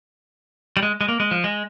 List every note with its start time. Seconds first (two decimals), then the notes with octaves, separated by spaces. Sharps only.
0.77 G3
0.83 G#3
1.01 G#3
1.09 A#3
1.20 G#3
1.31 F3
1.44 G#3